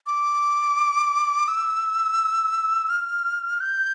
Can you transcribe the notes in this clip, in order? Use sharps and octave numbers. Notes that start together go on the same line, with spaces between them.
D6
E6
F6
G6